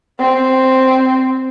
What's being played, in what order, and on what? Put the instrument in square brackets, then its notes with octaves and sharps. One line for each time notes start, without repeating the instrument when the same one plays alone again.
[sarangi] C4